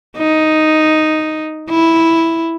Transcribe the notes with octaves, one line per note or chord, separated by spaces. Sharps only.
D#4
E4